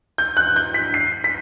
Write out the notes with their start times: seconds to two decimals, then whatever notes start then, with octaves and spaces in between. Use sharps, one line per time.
0.18 G6
0.37 F#6
0.56 G6
0.74 B6
0.94 C7
1.24 B6